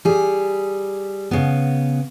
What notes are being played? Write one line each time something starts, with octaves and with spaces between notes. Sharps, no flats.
G3 G#4
C#3 B3